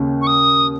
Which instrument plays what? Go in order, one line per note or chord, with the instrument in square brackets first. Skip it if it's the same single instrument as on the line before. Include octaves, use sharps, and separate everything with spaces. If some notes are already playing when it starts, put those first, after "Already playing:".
Already playing: [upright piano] D#2 C#3
[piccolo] C#6
D#6